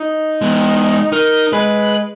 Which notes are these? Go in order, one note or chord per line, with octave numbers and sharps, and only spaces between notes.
D#4
G#3 B3
D#4 A#4
G#3 B4